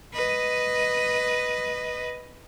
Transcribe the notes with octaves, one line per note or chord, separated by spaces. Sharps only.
B4 D#5